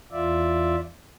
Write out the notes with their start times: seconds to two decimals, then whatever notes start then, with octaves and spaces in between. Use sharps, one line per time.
0.12 E2 F4 D5 E5